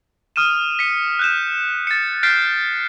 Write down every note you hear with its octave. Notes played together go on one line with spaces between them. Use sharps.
D#6 F6 D#7 E7
B6 C#7
F#6 G6 E7
A6 C#7
F6 G6 A6 B6 C7 D7